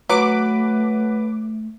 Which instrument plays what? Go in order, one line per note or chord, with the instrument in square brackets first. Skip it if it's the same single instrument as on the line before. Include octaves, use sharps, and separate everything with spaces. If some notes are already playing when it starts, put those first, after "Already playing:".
[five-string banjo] F#3 [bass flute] A3 [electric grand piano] B4 [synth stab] D6